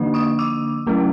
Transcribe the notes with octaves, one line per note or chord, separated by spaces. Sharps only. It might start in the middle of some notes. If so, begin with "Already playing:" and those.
Already playing: D3 F3 A#3 D4
C#6 D#6
D6 E6
F#3 A3 C#4 E4